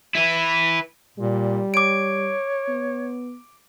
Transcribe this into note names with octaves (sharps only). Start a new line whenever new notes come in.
E4 B4
A#2 G3
C#5 D6 D7
B3